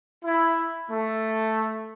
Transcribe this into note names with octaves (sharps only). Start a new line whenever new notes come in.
E4
A3